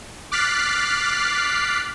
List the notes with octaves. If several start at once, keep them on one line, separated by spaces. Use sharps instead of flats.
D6 F6 F#6 A6 B6 C7